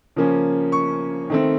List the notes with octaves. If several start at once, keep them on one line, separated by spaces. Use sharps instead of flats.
C#3 F3 A#3 C#4
C#6
D#3 A3 C4